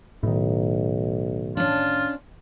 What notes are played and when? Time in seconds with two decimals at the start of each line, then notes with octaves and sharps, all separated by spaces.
0.23 B1 A2 D#3
1.57 C#4 D4 F4